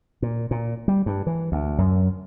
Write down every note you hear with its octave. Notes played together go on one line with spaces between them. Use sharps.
A#2
A#2
G3
G2
E3
D2
F#2